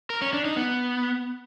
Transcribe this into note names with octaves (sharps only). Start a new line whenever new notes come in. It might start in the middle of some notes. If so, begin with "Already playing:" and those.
A#4
C#4
D4
D#4
B3